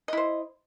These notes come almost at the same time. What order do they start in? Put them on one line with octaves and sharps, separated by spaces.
D#5 E4 C5